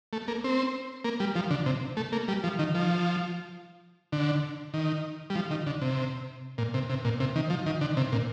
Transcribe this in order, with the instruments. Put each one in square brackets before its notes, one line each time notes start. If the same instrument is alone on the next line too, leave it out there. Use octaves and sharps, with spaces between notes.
[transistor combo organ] A3
A#3
C4
A#3
G3
F3
D3
C3
A3
A#3
G3
F3
D#3
F3
D3
D#3
G3
F3
D#3
D3
C3
A#2
C3
C3
A#2
C3
D#3
F3
D#3
D3
C3
A#2